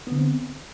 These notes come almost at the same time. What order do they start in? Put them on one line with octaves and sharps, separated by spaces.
B3 D3 C4